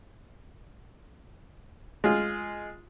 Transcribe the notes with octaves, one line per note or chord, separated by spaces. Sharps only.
G#3 F4